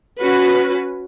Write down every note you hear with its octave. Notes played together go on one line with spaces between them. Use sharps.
C#4 F#4 B4